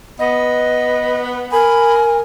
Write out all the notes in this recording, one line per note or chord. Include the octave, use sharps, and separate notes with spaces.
B3 D#5
A#4 G#5 B5